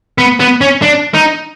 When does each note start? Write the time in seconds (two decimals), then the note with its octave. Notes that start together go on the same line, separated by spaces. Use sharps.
0.18 B3
0.40 B3
0.61 C#4
0.82 D4
1.14 D#4